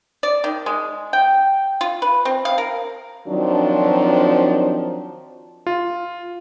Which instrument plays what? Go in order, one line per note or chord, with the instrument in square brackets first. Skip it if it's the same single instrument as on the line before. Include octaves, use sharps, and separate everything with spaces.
[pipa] D5
D#3
G#3
G5
F4
B4
C4
F5
A#4
[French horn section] D#3 F3 F#3 C4 D4
[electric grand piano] F4